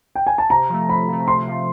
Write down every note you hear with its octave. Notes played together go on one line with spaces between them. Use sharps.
G5
G#5
A5
C3 A#5
F3 A3
C3 B5
F3 A3
C3 C6
F3 A3